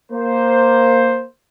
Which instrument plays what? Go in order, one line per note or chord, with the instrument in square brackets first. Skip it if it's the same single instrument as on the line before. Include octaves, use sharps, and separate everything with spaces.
[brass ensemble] A#3 C5